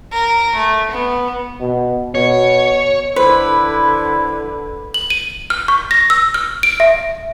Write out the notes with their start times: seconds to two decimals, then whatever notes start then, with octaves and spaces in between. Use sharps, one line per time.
0.12 A#4
0.56 A3
0.91 B3
1.60 B2
2.15 B2 C#5
3.16 D3 E4 B4 C5
4.94 F#7
5.10 D#7
5.50 F6
5.68 C#6
5.91 A#6
6.10 E6
6.34 F6
6.63 D7
6.80 E5